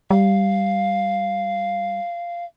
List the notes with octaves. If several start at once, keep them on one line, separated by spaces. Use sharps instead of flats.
G3 F5